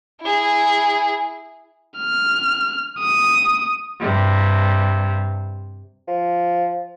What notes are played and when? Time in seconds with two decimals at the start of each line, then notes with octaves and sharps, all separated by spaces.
0.21 E4 G#4
1.98 F6
3.00 D#6
3.99 G2 C3
6.08 F3